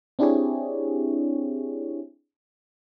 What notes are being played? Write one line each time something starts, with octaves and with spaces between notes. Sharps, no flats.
C4 D4 E4 G4 G#4 C#5